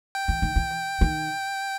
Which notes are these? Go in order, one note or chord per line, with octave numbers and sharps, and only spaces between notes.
G5
E3
D#3
E3
D#3